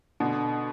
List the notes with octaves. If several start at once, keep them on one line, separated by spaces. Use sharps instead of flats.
B2 D3